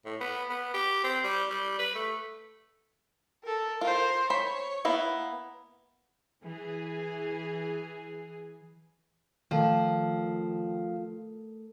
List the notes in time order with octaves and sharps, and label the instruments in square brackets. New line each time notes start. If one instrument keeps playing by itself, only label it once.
[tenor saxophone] A2
B3
B3
G4
C4
G3
G3
B4
A3
[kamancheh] A4 A#4
[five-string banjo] F4 [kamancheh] A#4 C5
[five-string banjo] C5 B5 [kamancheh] C#5
[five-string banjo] A#3 B3 E4
[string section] E3 G#4
[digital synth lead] D#3 [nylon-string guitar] F3 [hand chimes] A3 A4 A#4